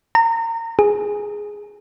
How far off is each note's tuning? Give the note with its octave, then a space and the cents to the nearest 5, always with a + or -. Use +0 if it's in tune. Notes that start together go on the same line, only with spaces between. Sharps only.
A#5 -30
G#4 +0